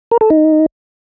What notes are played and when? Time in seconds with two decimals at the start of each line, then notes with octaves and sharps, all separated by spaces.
0.11 A#4
0.21 A4
0.30 D#4